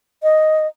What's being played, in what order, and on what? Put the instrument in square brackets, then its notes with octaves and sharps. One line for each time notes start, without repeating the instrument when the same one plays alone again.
[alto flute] D#5